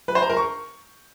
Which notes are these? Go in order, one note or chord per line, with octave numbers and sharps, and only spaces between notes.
B4
C5
A#5
A#4
C#6